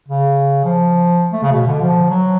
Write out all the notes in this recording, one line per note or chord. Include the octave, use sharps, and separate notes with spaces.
C#3
F3
A3
C#3
B2
D3
F3
F#3